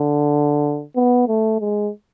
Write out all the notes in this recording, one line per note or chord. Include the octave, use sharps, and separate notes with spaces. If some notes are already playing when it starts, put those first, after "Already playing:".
Already playing: D3
B3
A3
G#3